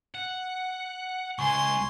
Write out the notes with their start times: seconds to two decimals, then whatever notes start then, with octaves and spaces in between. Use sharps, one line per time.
0.14 F#5
1.39 C#2 G#5 C6 C#6